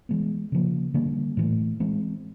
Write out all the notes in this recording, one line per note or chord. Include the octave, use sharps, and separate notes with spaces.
E3 G#3 B3
C#3 F3 A#3
D3 G3 A#3
A2 E3 A3
E3 G#3 C4